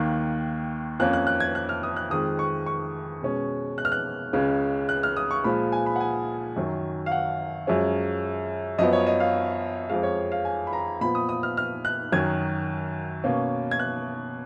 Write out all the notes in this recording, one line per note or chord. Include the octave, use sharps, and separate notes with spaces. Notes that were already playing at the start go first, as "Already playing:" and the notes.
Already playing: D#2 D#3 A#3 F#6
F2 F3 A#3 C#4 F#6
F#6
F#6
G#6
F#6
F6
D#6
F#6
F2 D#3 G#3 D#6
C#6
C#6
B2 G#3 C#4
F#6
F6
F#6
C#2 C#3 G#3 C#4
F#6
F6
D#6
C#6
A#2 F3 G#3 B5
G#5
B5
F#5
G#5
F#2 D#3 F#3
F5
F#5
F#2 F3 G#3 C#4
F#2 F3 B3 D#5
C#5
D#5
F5
F2 F3 G#3 F5
C#5
F5
G#5
B5
A#5
A#2 F3 B3 B5
D#6
D#6
F6
F6
F#6
F#2 D#3 F#3 G#6
B2 A#3 C#4
G#6
F#6